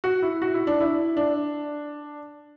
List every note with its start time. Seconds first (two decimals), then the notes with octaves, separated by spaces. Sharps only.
0.04 F#4
0.22 E4
0.42 F#4
0.54 E4
0.67 D4
0.80 E4
1.17 D4